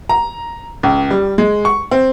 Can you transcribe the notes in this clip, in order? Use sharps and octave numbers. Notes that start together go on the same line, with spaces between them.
A#5
C#2
G3
G#3
C#6
C4